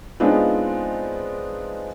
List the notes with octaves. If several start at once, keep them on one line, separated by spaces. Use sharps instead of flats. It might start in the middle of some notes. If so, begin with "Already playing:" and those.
G#3 B3 C4 D4 D#4 F4